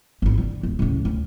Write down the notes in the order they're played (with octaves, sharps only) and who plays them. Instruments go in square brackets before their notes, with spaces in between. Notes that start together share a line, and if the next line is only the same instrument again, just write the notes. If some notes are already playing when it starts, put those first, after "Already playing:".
[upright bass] G#1 D#4
D3
D1
C#2 A2
D2